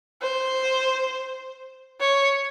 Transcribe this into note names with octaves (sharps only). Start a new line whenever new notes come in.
C5
C#5